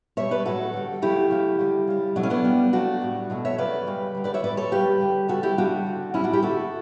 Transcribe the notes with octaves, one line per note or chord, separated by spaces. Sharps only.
B2 G3 C#5 E5
B4 D5
A2 F#3 A3 F#4 A4
D3 G3
C#3 F#3 A3 E4 G4
C#3 F#3 A3
D3 G3
C#3 G3
B2 F#3 A3 D4
C#4
B3 D4
C#3 G3
C#3 F#3 A3 D4 F#4
A2 G3
B2 F#3 A3
C#5 E5
C#3 F#3 A3 B4 D5
C#3 G3
D3 G3
B4 D5
C#5 E5
A2 G3 B4 D5
A4 C#5
C#3 G3 G4 B4
D3 G3
C#3 G3 F#4 A4
E4 G4
C#3 G3 D4 F#4
D3 A3
A2 G3 C#4 E4
D4 F#4
E4 G4
D3 A3 F#4 A4